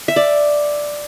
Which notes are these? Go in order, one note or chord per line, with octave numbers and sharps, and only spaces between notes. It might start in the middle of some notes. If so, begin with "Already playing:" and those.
E5
D5